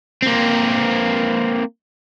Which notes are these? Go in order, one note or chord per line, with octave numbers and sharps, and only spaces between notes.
A#3 C4